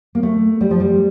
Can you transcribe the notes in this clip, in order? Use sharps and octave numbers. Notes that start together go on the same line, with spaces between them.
A#3
A3
G3
F3
G3